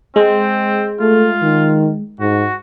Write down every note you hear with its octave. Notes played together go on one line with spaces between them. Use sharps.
G#3 C4
A3 F4
D#3
G#2 F#4